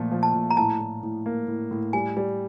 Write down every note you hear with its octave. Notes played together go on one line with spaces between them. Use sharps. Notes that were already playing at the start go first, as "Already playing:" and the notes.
Already playing: A#2 F3 A3
F3
A5
A#2
A#5
A2 A5
A2
A2
A#3
A2
A2
G3 G#5
G3